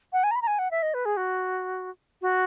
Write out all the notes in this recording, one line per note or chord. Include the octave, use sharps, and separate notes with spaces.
F#5
G#5
A#5
B5
A#5
G#5
F#5
E5
D#5
B4
G#4
F#4
F#4